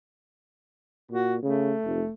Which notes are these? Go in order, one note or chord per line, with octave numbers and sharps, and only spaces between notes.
A#2 F#4
C#3 A3
F1